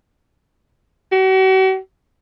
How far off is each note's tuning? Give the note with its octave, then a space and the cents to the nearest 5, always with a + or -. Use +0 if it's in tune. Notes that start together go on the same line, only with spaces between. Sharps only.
F#4 +45